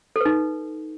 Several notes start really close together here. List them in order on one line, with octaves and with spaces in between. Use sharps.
A4 B4 D#4